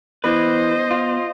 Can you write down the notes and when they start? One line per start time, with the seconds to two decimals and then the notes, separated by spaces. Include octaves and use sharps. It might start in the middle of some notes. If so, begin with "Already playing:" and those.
0.24 E3 B3 B4 C5 D#5
0.91 F4